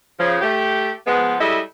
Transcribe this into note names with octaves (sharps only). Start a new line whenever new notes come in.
C#3 F3
A3 G4
F3 G#3 B3
G3 G#3 E4 A4 D#5